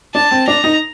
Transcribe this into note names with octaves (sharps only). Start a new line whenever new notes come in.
D4 A5
C4
D4 A#5
D#4